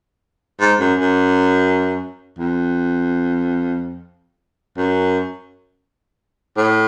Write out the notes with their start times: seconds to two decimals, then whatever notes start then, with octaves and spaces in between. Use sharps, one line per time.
0.60 G#2
0.79 F#2
1.00 F#2
2.39 F2
4.77 F#2
6.57 A2